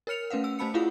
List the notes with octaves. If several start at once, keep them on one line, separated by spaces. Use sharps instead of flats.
A#4 C#5 F6 C#7 F7
A3 C#4 B4 F5 F#5
E6
A3 C5 A5 B5 C#7
E4 F4 G4 G#4 F5 F#5